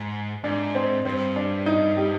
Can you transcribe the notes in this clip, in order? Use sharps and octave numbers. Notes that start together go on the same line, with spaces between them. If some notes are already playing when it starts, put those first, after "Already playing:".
Already playing: G#2
G#2 D4
C4
G2 C4
D4
D#4
G4